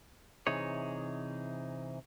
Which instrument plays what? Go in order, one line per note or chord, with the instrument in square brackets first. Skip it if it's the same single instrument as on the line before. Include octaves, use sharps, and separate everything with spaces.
[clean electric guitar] C3 E3 D#4 G#4 C#5